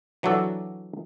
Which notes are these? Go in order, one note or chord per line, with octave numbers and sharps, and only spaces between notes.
E3 F#3 D4 F#4 A4 D5